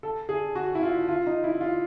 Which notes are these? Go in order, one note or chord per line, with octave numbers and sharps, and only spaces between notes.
A4
G#4
F#4
E4
F4
F4
D#4
E4
F4